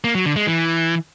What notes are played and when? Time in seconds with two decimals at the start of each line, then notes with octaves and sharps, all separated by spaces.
0.04 A#3
0.15 F#3
0.26 D3
0.36 G#3
0.47 E3